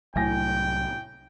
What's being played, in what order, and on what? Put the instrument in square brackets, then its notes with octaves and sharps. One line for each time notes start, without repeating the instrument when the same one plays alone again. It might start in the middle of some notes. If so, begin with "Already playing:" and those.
[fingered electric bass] C2 F#3 [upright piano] A2 G#5 A#6 [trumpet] G5